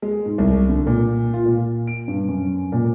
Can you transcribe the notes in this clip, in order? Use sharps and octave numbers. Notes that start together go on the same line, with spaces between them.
G#3
G#2
C2
D3
A#2
F4
A#2
D7
G2
F#2
A#2